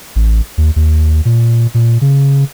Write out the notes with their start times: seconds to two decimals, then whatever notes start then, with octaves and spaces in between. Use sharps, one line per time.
0.16 A1
0.58 D#2
0.76 D#2
1.25 A#2
1.74 A#2
2.01 C#3